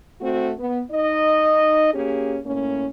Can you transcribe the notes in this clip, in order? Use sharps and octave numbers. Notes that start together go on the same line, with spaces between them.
A3 C4 F#4
B3
D#4 D#5
A#3 C#4 G4 G#4
A2 A#3 C#4